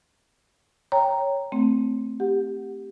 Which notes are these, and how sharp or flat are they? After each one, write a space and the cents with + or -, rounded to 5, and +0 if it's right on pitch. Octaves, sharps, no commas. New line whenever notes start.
C#5 +0 G5 +0 A#5 +0
A3 +10 C4 +0
G4 +0 F#5 +0